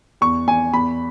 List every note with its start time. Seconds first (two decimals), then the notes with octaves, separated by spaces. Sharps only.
0.21 E2 C#6
0.47 E2 G#5
0.73 E2 B5